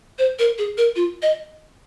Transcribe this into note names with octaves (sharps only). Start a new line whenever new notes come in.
C5
A#4
G#4
A#4
F4
D#5